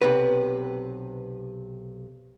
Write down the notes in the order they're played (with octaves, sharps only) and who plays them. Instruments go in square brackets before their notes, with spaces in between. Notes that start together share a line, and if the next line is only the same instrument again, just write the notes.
[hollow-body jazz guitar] B1 C3 B4